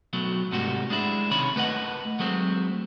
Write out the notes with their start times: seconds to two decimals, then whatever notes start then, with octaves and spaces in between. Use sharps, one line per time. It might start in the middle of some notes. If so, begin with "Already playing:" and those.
0.13 B2 F#3 A3
0.52 G#2 C3 G3 A3 F#4
0.90 G#3 D4 E4
1.31 C#2 C3 D#3 C#4 C#5 B5
1.56 A3 B4 D#5 F#5
2.19 F#3 G#3 A3 C4